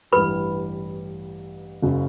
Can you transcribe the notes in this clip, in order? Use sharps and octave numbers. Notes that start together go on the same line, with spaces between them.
A1 G2 E3 G3 B4 B5
F#1 F#2 C#3